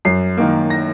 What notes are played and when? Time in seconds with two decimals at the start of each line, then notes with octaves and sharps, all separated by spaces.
0.05 F#2 C7
0.37 D#3 A#3
0.70 A#6